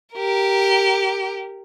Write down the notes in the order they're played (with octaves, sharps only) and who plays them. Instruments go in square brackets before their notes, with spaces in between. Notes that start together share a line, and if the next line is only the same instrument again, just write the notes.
[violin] G4 A#4